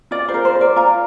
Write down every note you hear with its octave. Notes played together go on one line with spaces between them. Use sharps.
F4 D5
C5
A#4
C5
A#4
D5
F4 A#5